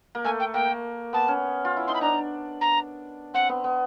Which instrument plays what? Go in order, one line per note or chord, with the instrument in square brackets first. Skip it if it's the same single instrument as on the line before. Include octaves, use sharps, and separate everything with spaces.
[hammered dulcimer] A#3
[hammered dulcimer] A3 [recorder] G#5
[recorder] G5
[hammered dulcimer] A#3 [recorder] G5
[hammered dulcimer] B3 [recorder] A5
[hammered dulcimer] C#4
F4
E4
[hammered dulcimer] D#4 [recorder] C6
[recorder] B5
[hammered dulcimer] D4 [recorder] A#5
[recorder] A#5
[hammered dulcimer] C4 [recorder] F#5
[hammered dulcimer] B3
B3